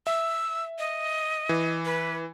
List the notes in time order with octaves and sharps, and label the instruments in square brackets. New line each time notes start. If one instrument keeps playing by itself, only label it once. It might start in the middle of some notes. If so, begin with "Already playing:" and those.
[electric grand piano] E5 [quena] E6
[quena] D#5
[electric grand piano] E3
[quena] B4